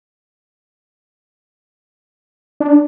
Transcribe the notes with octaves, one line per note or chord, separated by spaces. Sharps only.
D4